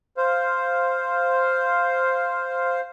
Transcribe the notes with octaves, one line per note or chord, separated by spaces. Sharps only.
C5 F5